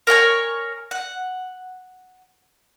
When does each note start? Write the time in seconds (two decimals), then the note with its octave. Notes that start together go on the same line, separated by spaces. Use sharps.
0.07 A#4 C#5 G5 G#5
0.91 F#5